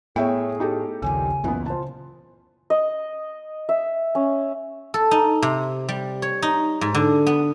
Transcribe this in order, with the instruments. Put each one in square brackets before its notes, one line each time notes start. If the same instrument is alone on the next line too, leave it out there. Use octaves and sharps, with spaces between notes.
[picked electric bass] A2 [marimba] A3 B3 [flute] G#4 [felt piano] C#5 E5 G5
[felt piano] D#4 G4 A4
[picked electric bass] A#1 D#2 A#2 [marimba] C#3 [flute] G#5
[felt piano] F#1 B3 [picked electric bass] C#2 A#2 E3
[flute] F4 [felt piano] C5 A5
[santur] D#5
E5
C#4
[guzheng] A4
D#4
C3
G3
C#5
D#4
G#2
D3
B3